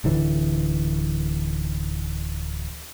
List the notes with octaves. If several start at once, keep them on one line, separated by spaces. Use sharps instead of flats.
D1 D3 E3